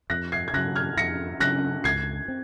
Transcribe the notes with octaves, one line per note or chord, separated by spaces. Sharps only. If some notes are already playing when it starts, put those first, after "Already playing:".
F2 F#6 A#6
G#6 C7
G#6
C#3 F#3 F#6 A#6
F6 G#6
F2 A#6 C#7
C#3 F#3 F#6 A#6
C#2 G#6 C7
C4